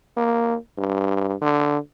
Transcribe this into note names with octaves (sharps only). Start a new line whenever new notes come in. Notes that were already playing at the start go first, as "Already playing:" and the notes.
A#3
G2
D3